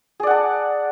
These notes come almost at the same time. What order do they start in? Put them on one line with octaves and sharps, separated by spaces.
G#4 D5 F#5 A5